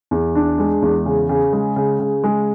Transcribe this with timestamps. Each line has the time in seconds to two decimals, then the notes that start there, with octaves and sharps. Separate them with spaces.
0.11 E2
0.35 D4
0.59 G#3
0.82 E2
1.06 C#3
1.29 C#3
1.53 G#3
1.76 C#3
2.00 C#3
2.24 G#3